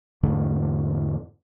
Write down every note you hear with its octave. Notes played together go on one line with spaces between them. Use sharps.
E2 G#2 D3 A3